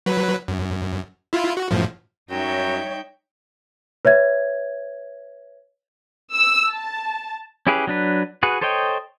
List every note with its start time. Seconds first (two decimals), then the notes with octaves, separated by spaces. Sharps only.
0.06 F#3 B4
0.48 F#2
1.33 E4 F4
1.57 F#4
1.71 F#2 A2 F3
2.30 F#2 G3 D#4 C#5 E5 G5
4.05 B4 C#5 E5 G#6
6.34 E6
6.72 A5
7.67 C#4 E4 G4 G#4 B4
7.87 F#3 D4 B4
8.43 F#4 G#4 B4
8.61 A4 C5 C#5 D#5 G5